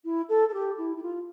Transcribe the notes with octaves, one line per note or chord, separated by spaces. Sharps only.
E4
A4
A4
G4
E4
E4
F4